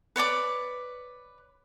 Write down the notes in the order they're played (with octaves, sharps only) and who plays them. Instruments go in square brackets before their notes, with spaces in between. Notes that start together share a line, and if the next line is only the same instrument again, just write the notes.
[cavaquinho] B4 C#5 D5 D6